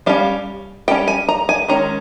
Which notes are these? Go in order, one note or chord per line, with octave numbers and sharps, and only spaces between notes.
G3 C#4 F5
G3 C#4 G5
G#5
A#5
G#5
D#3 G#3 C#4 A#5